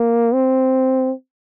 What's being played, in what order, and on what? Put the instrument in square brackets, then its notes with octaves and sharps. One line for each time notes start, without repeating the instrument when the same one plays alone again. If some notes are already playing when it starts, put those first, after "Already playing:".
Already playing: [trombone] A#3
C4